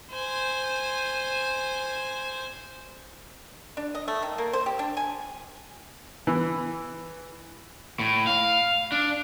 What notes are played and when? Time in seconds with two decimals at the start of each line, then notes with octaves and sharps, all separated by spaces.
0.11 C5 G#5
3.77 D4
3.95 D#5
4.08 A3
4.22 D#3
4.38 A#3
4.53 C5
4.66 G4
4.79 D4
4.97 G#5
6.27 E3
8.00 A2
8.27 F5
8.92 D4